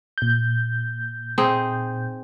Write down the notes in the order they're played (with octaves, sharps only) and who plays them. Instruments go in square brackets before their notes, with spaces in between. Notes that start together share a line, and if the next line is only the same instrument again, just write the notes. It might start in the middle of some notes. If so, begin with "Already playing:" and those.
[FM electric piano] A#2 G6
[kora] C4 D#4 G#4